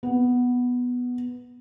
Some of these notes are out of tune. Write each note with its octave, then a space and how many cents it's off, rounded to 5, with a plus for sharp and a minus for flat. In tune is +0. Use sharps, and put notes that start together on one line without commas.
B3 +0